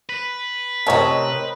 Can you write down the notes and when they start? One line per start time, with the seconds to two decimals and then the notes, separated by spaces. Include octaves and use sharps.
0.09 B4
0.87 A2 C3 C#4 A#4 C5 C#5 D#5 A5